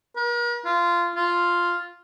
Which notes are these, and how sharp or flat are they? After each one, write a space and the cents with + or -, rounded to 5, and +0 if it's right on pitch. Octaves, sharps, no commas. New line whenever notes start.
A#4 +45
F4 -15
F4 +0